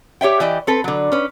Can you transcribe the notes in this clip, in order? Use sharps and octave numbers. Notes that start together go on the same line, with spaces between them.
G4 C#5 E5 G5
E3 E4 G4 D5 D#5
C4 A4 B4
D3 F#3
C#4 B4